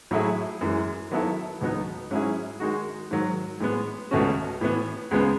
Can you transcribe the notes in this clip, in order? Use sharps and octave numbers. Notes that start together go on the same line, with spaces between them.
A2 F#3 A3 E4 G#4
F#2 E3 G#3
D#3 F#3 B3 E4 A4
C#2 B2 F#3 B3 D#4
G#2 F#3 C#4 E4 G#4
D#3 G#3 D#4 F#4
G#2 D#3 F#3
A2 G#3 B3
C#2 B2 A3 C#4 F#4
A2 E3 B3
C#2 C#3 G#3 B3